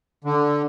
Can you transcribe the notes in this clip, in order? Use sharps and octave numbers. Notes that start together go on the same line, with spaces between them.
D3